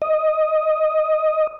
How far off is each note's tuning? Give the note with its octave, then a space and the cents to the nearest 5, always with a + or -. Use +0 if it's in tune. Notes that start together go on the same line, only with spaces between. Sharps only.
D#5 +0